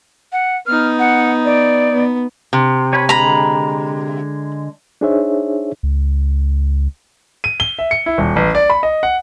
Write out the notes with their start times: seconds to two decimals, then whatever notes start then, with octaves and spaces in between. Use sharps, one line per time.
0.32 F#5
0.67 B3 D#4 F6
0.99 F#5
1.45 D5
1.92 B3
2.53 C3
2.93 C#5 G#5 B5
3.09 D3 G#3 A#5 B5
5.01 D4 D#4 G#4 C5 C#5 E5
5.83 C#2
7.44 D#7
7.60 G7
7.79 E5
7.91 C#7
8.06 E4
8.18 D#1
8.36 A1
8.55 D5
8.70 B5
8.83 D#5
9.03 F#5